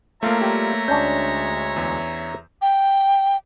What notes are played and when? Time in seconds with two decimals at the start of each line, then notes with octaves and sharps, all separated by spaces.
0.23 A3 A#3 F4 C#5 E5 F5 A#5
0.41 G3 F4 G4
0.88 D2 G#3 C#4 D4 G6
1.76 E2
2.62 G5